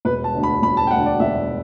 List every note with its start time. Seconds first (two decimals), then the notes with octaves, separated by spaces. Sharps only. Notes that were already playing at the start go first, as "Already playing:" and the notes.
0.05 E1 B4
0.24 A5
0.34 D2 D3
0.43 B5
0.62 E1 B5
0.77 A5
0.87 G5
0.91 D2 D3 F#5
1.05 D5
1.20 E1 E5